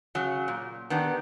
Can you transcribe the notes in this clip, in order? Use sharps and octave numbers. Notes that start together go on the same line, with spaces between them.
C#3 F#3
A#2
D#3 B3 D4 G4